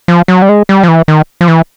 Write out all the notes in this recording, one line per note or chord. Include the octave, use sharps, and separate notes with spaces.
F3
F#3
G3
G#3
G3
F3
E3
D#3
F3
E3